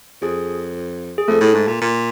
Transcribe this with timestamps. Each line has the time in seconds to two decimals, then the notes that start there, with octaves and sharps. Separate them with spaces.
0.22 F2 G#4
1.18 G#4
1.28 F2 A3 A4
1.41 A2
1.54 G#2
1.67 A#2
1.81 A#2